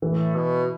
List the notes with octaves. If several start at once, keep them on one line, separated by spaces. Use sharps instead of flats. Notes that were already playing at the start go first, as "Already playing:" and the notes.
A2 E3
B2